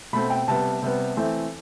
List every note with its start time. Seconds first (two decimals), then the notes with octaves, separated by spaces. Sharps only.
0.13 B2 A3 C4 B5
0.30 G5
0.48 C3 G3 B3 A5
0.82 C3 G3 B3
1.17 E3 A3 C4